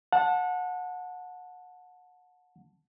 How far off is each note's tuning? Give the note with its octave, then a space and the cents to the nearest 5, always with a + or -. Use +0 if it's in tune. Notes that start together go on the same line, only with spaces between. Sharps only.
F#5 -25 A5 +0